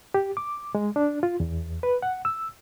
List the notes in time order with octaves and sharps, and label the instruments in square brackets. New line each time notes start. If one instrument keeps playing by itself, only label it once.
[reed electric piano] G4
D6
G#3
D4
F4
E2
B4
F#5
E6